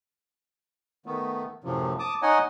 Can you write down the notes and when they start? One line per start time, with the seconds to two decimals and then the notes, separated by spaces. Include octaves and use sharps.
1.06 D#3 A3 B3
1.64 F#2 A2 C3 F3
1.99 A5 D6 D#6
2.22 D#4 C#5 D#5 F#5 G#5